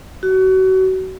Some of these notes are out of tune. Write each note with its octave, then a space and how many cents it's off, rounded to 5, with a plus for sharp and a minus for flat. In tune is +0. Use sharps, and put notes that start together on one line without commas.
F#4 +30